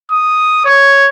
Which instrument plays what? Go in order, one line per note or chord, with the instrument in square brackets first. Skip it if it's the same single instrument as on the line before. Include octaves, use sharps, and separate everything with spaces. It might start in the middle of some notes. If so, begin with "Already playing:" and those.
[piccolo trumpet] D#6
C#5